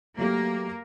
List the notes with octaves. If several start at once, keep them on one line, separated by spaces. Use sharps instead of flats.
F#3 A3 A#3 G4